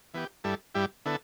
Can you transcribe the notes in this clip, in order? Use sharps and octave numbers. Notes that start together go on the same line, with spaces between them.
E3 B3 G4
G2 G3 E4 A4
G2 G3 E4 G4
D3 B3 E4 A4